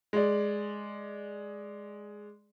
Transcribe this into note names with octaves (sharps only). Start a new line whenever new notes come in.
G#3 D5